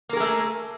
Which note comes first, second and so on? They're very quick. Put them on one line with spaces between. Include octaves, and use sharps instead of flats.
A#3 A#4 G#4 A3